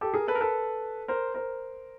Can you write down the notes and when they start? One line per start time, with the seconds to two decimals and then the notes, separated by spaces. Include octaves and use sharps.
0.01 G4 A4
0.14 G#4 A#4
0.27 A4 B4
0.35 A#4
0.41 A4 B4
1.08 A#4 C5
1.34 A#4 C5